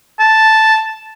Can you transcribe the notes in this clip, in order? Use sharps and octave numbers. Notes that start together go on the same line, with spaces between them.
A5